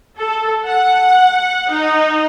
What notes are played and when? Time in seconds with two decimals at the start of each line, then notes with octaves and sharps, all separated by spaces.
0.18 A4
0.66 F#5
1.70 D#4